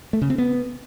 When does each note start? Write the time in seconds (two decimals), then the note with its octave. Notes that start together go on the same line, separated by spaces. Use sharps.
0.13 A3
0.22 C#3
0.30 C4
0.38 B3